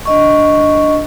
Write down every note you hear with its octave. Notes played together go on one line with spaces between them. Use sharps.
D4 D#5 C#6